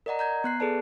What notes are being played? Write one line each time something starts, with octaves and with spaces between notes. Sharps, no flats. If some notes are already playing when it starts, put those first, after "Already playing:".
A#4 D5 D#5 F#5 A#5
A#5 G6 G#6
B3 F#6 C7
G#4 A4 B4 D5 A5